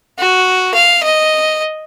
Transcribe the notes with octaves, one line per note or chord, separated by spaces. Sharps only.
F#4
F5
D#5